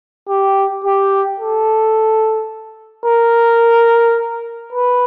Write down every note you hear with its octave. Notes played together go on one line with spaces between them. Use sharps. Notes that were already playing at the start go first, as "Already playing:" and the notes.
G4
G4
A4
A#4
B4